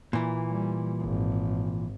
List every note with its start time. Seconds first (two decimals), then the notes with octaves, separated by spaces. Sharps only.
0.13 A#2 E3
0.50 G3
1.00 G#1